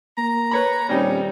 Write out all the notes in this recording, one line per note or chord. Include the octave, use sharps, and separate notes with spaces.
A#3 A#5
B4 C#5 B5
D#1 G3 C4 C#4 D#4